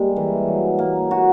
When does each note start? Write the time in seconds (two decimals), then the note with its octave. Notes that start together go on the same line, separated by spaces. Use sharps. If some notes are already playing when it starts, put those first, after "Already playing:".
Already playing: G3 G#3 A#3
0.16 E3
0.48 F#3
0.79 A#3
1.11 F#4